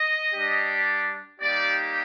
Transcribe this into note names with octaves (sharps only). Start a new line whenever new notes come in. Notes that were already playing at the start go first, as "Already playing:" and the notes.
Already playing: D#5
G3 D4 G4
G3 A#3 D#4 G4 D5